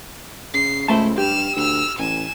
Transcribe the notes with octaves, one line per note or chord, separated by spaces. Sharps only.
C#3 C7
C#2 A3 E4 C5 A5
G2 G4 F6 E7
D2 E6 F6
A1 G#5 E7